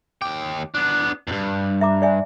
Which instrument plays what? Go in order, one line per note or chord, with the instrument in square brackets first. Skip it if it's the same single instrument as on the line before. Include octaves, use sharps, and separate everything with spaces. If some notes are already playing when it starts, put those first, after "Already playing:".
[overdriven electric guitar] D#2 G5 [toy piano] D6
[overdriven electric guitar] B3 D4
E2 G2
[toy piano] E5 A#5 D6
D5 E5 G#5